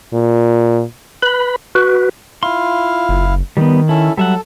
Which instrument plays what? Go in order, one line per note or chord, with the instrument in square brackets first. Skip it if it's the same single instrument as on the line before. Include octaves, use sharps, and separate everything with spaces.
[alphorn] A#2
[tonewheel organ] B4 B5
F#4 B4
[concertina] E4 F5 [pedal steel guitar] F4 C6
[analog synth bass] F#1
[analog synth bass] D#3 [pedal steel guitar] G3 B3
[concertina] C#4 A4 [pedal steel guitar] E4
[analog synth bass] F#3 [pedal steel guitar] G3 E5 F#5 [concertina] A4